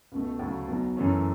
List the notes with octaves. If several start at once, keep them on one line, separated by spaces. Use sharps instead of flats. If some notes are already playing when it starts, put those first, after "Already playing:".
C#2 B2 A3
D2 C#3 F#3 A3
B1 B2 F#3
F#2 E3 A3 C#4